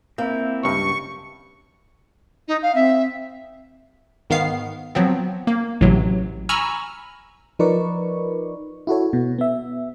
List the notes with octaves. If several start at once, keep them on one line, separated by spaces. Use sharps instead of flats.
A#3 C4 E4
C#2 G2 C#6
D#4
F5
C4 E5
G#2 D#3 B3 F5 C7
F3 F#3 B3 C4
A#3
A1 A2 C3 F#3
G#5 A#5 B5 C#6 E6 F6
F3 D#4 A#4 B4 D5 C#6
E4 F#4 A4 C#5
B2
B3 E5